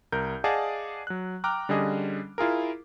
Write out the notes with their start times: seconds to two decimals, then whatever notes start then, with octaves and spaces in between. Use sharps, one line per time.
0.12 C2 A#4 G6
0.44 G#4 D5 D#5 F5 F#5 A5
1.07 F#3 F#6
1.44 G5 A#5 D6 F6 F#6
1.69 D3 G3 C#4 G#4 D#5
2.38 E4 F4 G#4 A#4